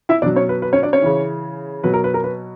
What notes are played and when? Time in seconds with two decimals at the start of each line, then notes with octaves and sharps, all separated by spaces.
0.09 E4 E5
0.22 B2 F#3 D4 D5
0.36 C#4 C#5
0.49 B4
0.62 B4
0.73 C#4 C#5
0.82 D4 D5
0.93 C#4 C#5
1.02 C#3 E3
1.84 B2 F#3 B4
1.93 A#4
2.04 B4
2.14 A#4
2.24 B4